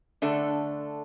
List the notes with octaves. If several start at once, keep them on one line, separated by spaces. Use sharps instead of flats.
D3 A3 D4 A4